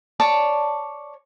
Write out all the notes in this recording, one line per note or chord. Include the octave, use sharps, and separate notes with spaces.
C#5 D5 A5